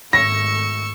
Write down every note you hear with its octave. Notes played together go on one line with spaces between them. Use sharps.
G#1 A3 C#6 E6 A#6